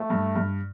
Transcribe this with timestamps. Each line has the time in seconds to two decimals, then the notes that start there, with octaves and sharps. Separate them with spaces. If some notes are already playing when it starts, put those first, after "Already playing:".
Already playing: A3
0.10 G2
0.35 G2